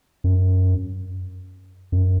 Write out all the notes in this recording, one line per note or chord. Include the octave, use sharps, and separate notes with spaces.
F#2
F#2